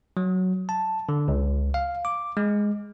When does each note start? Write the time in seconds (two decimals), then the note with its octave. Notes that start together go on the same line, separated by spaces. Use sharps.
0.17 F#3
0.69 A5
1.09 D3
1.28 C#2
1.74 F5
2.05 D6
2.37 G#3